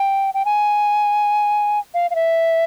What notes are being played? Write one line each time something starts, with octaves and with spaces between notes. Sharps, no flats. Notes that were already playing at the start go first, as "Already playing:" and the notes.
Already playing: G5
G5
G#5
F5
F5
E5